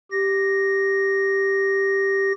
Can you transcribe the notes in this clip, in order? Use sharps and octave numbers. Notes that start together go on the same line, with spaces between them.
G4 A#6